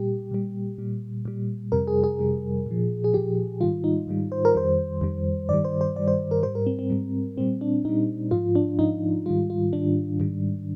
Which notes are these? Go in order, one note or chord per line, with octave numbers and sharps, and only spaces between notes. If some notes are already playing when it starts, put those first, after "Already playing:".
Already playing: A#2 G3 G4
A#2 G3
A#2 G3
A#2 G3
F2 C3 G3 A#4
G#4
G#4
F2 C3 G3
A#2 F3
G#4
A#2 F3 G4
G#2 D#3 G3 F4
D#4
G#2 D#3 G3
C5
A#4
F2 D#3 G3 C5
F2 D#3 G3
G2 D#3 G3 D5
C5
C5
G2 D#3 G3 D5
C5
A#4
G#2 G3 C5
A#4
C4
C4
G#2 G3
A#2 G3 C4
D4
A#2 G3 D#4
G#2 F3 F4
D4
G#2 F3 D#4
G#2 D#3 G3 F4
F4
G#2 D#3 G3 D4
G#2 D#3 G3